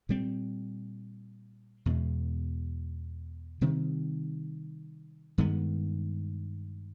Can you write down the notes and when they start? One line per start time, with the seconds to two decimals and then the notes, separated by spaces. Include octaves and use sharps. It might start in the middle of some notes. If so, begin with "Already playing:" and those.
0.09 A#2 G3 C4
1.86 E2 B2 G#3
3.61 C3 D#3 G3 C4
5.38 G2 D#3 G#3 B3